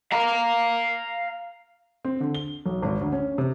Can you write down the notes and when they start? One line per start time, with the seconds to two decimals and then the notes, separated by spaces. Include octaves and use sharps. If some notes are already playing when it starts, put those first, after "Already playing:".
0.12 F5 A#5
2.05 C4
2.20 D3
2.35 G7
2.66 B1
2.83 G#1
3.01 D2
3.12 C#4
3.38 C3